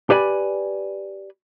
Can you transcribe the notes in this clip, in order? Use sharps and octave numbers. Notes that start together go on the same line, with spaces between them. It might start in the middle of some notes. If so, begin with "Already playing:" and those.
G4 B4 D5 G#5 B5